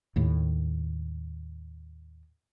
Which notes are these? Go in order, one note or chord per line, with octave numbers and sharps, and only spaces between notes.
D#2 A2